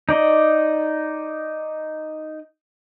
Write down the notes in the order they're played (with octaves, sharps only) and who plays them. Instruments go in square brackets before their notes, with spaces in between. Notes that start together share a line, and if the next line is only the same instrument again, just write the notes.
[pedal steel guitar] D#4 D5 D#5